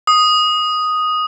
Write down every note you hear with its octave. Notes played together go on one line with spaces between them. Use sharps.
D#6